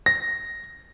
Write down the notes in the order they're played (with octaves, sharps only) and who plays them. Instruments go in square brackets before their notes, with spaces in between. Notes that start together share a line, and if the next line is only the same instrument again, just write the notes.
[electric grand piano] A#6